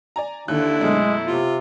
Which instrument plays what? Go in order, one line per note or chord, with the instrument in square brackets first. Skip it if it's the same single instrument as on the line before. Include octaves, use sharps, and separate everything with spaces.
[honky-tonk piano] D5 G#5 A#5
[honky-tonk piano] D#2 F#6 [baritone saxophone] D3 [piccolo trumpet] E4
[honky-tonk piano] F#2 B2 A3 [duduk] G#3
[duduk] C3 [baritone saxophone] F4